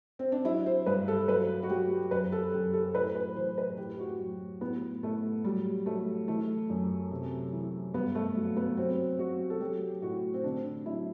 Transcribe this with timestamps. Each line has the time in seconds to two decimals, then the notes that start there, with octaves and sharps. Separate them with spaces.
0.19 C4
0.32 D4
0.45 F#3 E4
0.66 C5
0.86 G2 B4
1.08 A4
1.28 F#3 B4
1.63 F#4
1.69 F#3 G4
2.11 F#2 B4
2.32 A4
2.54 F#2 G4
2.73 A4
2.95 A2 B4
3.15 B4
3.36 E3 C5
3.58 B4
3.78 A2 G4
3.99 F#4
4.20 F#3
4.61 A2 B3
5.03 A2 A3
5.44 F#3 G3
5.86 F#3 A3
6.27 E3 A3
6.70 F#2
7.11 C3
7.53 E3
7.94 G2 B3
8.15 A3
8.36 F#3
8.56 B3
8.77 F#3 C4
9.19 F#3 F#4
9.50 A4
9.61 F#3 G4
10.02 A2 F#4
10.34 C4
10.44 D3 D4
10.86 F#3 E4